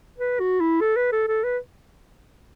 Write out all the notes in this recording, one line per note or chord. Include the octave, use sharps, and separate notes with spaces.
B4
F#4
E4
A4
B4
A4
A4
B4